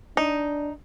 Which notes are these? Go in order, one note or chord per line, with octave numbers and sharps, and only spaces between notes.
D4 D#4